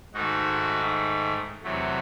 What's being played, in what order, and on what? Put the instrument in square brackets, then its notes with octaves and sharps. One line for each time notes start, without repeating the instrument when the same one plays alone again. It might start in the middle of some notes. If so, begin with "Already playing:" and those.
[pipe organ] G#2 D#3 A3 D#4 F#4
E2 C3 F#3 A3